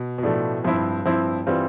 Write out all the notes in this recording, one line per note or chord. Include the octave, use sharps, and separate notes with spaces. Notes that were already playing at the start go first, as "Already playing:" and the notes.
Already playing: B2
B2
A2 F3 A3 D4
G2 F3 C4 E4
F3 C4 E4
E3 G3 C4 F4